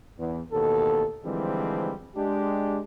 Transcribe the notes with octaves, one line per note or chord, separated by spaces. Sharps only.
E2
A1 D#2 B2 A4
D3 E3 F3 G3 G#3 C4
G#3 D4 G4